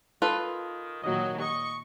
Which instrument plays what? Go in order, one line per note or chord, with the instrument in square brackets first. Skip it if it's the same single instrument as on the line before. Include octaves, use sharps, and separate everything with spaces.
[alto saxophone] D#3 [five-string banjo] F4 A4 B4
[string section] A#2 D#3 F#3 [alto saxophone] D#5
[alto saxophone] D#5 [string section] C#6